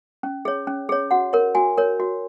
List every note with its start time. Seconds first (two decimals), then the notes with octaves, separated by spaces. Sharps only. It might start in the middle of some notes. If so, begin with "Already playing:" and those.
0.23 C#4
0.45 G#4 C#5
0.67 C#4
0.89 G#4 C#5
1.11 F#4 F#5
1.33 A#4 C#5
1.55 F#4 G#5
1.77 A#4 C#5
2.00 F#4